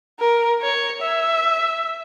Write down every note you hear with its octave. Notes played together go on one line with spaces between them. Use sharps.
A#4
C#5
E5